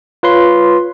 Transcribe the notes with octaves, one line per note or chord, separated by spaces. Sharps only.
F4 B4 C#5 C6